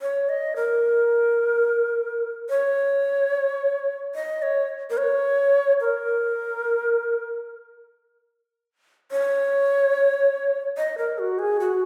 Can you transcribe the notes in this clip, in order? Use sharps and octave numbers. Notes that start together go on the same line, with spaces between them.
C#5
D#5
A#4
C#5
D#5
C#5
A#4
C#5
A#4
C#5
D#5
A#4
F#4
G#4
F#4